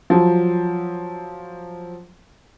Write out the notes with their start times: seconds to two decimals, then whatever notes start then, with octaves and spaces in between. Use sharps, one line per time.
0.10 F3 F#3